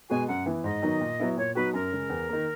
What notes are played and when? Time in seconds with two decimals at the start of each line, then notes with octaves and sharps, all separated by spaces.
0.10 B2 G#3 B3 F#4 G#5
0.28 F#2 F#5
0.46 E3 B3 E4
0.64 G#2 D#5
0.82 D#3 F#3 B3 D#4
1.01 A#2
1.20 F#3 B3 E4
1.37 A#2 C#5
1.55 F#3 B3 D#4 F#4 B4
1.73 F#2 A#4
1.92 C#3 G#3
2.09 E2
2.29 D#3 A#3